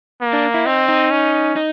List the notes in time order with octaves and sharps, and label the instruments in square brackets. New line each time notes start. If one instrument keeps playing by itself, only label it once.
[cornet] A#3
[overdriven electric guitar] D4
E4
[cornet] C4 [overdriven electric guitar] D#4
[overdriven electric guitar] D#4
[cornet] C#4
[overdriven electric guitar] D#4